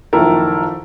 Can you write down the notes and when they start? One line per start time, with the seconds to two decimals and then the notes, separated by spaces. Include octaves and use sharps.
0.13 F#1 D#3 F3 E4 A4 A#4